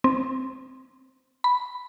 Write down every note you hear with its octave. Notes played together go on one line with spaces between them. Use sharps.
C4
B5